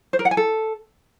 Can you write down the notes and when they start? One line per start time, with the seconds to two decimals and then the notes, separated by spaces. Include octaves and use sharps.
0.13 C5
0.19 A#4
0.25 F#5
0.31 G#5
0.37 A4